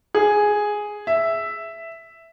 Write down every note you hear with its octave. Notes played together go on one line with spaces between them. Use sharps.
G#4
E5